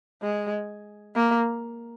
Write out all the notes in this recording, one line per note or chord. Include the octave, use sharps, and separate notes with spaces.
G#3
A#3